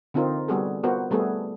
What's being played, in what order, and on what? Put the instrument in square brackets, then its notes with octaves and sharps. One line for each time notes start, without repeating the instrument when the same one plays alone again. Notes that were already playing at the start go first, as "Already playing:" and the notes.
[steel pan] D3 C4 D#4 F4 A#4
G3 B3 F#4 G#4 A4
B3 F4 F#4 A#4 C5
G3 A3 B3 G#4 A4